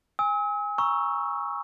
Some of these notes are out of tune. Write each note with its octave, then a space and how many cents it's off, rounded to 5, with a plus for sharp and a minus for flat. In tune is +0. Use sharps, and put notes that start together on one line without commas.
G#5 -20 E6 -45
A#5 +20 C#6 +0 E6 +5